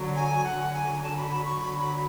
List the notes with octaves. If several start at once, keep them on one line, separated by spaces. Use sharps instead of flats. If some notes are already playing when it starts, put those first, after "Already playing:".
Already playing: D3 F#3
G#5
D3 F#3 F#5
G#5
A5
B5
B5
C#6
D3 F#3 B5
B5